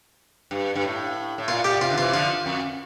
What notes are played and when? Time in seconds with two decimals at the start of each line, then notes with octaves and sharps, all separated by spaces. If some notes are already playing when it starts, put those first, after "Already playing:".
0.51 G2
0.75 G2
0.83 A2
1.38 A2
1.48 A#2 F4
1.64 A#2 G4
1.81 C3 F4
1.91 D3
1.98 C3 E3 F4
2.13 D3 F3 F4
2.46 F2